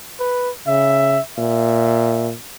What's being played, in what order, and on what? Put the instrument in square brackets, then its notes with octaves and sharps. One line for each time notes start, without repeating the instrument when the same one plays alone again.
[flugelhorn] B4
[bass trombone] C#3 [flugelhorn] E5
[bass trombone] A#2 [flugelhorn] E5